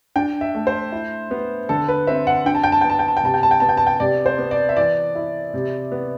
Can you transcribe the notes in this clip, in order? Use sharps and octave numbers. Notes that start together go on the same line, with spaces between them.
D4 G5
E5
A3
C5
E4
B3
D3 A4
B4
C4 E5
F#5
D4 G5
A5
G5
A5
B3 G5
A5
G5
A5
G5
C3 A5
G5
A5
G5
B3 A5
G5
A5
G5
C3 D5
C5
B3
D5
E5
E3 D5
E4
C3
B3